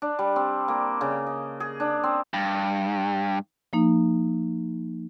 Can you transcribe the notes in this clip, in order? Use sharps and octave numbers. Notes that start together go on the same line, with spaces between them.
D4
G3
C4
A#3
C#3
D#5
G#4
D4
C4
G2
F3 A#3 D#4